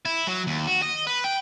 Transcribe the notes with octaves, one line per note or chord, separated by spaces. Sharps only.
E4
F#3
D#2
F#4
D#5
B4
G5